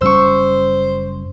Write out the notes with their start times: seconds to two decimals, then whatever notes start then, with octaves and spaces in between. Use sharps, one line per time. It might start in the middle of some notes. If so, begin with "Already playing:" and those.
0.01 F#1 G3 C#4 C5 C#6 E6